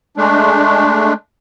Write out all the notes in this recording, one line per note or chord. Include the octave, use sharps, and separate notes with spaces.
G#3 A3 D4